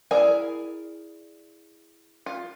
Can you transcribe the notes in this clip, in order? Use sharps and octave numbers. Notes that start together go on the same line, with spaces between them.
E4 G#4 A#4 D5 G#5
F4